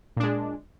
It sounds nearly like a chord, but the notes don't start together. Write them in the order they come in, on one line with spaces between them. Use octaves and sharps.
A#2 D4 G#3